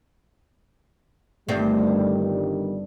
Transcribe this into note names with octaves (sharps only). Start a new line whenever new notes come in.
G1 G2 D#3 G3 A3 C4